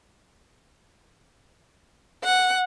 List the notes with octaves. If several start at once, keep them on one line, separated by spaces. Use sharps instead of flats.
F#5